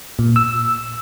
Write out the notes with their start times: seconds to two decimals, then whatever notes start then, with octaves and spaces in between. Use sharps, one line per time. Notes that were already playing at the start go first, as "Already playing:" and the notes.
0.19 A#2
0.36 E6